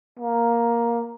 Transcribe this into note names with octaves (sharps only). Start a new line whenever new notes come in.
A#3